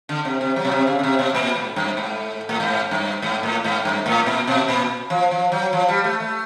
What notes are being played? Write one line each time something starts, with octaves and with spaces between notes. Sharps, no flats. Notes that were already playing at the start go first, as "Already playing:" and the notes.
D3
C3
C3
F#3
B2
C3
C#3
C#3
C3
B2
A#2
G#2
G2
G#2
A2
G#2
G2
G#2
A2
G#2
G2
A2
A#2
B2
A#2
F3
F3
F#3
F3
G3
A3
A3